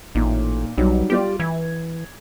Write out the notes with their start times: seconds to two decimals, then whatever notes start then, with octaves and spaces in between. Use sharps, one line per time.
0.15 A1 A#2 D#4
0.78 B1 F#3 G3 D#4
1.10 G3 F4 G4 D5
1.40 E3 G#6